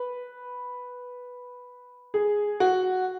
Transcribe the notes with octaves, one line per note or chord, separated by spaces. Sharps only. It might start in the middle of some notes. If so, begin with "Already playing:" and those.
Already playing: B4
G#4
F#4